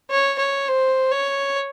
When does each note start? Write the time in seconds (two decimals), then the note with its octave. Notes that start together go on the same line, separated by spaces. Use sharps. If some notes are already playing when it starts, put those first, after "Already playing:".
0.10 C#5
0.39 C#5
0.68 C5
1.12 C#5